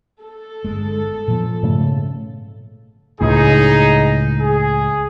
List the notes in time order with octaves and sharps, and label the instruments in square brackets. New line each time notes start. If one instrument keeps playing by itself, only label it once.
[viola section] A4
[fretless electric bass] G1 G#3
A#2 F3 B3
[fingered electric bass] G#2 C#3 A3
[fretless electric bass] C#2 A2 [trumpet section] D#4 G#4
[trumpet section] G#4